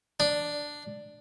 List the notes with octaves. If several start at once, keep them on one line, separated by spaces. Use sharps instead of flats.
D4